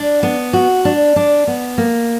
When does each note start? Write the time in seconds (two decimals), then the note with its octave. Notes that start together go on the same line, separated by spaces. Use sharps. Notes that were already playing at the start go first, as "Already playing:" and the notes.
Already playing: D4
0.23 B3
0.53 F#4
0.85 D4
1.16 D4
1.47 B3
1.78 A#3